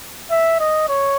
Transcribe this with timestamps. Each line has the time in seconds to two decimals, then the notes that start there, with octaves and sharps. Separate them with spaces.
0.31 E5
0.60 D#5
0.89 C#5